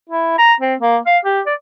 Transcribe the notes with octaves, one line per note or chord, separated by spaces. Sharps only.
E4
A#5
C4
A#3
F5
G4
D5